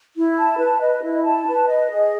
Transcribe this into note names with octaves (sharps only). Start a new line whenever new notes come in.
E4
A5
B4
D#5
E4
A5
B4
D#5
G#4